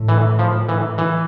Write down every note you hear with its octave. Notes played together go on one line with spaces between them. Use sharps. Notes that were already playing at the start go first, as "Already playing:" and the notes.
Already playing: A2
E3
F3
E3
E3